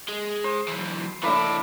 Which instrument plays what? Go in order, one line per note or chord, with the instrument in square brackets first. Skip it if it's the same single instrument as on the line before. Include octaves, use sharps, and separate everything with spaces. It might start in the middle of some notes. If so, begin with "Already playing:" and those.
[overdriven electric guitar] G#3
[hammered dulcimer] C5
[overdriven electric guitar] E3 F#3
[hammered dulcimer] A2 B5 D6 [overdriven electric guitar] E3 D4